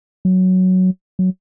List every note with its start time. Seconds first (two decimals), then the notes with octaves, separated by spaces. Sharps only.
0.25 F#3
1.19 F#3